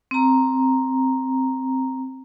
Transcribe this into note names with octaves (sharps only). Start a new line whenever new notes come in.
C4 A#5